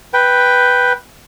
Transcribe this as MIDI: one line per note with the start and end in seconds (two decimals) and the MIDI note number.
0.14 0.93 71
0.14 0.93 79